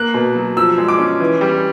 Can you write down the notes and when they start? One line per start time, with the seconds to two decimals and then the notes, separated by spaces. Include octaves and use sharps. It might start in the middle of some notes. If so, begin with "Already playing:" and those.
Already playing: A#3 F#6
0.14 B2
0.35 F#3
0.57 F3 E6
0.78 G#3
0.88 D6
0.99 C#4
1.20 E3
1.41 G3